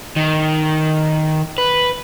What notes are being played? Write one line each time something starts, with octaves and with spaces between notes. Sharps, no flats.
D#3
B4